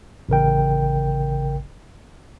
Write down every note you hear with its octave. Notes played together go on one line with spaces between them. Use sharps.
A1 C#3 A#4 G5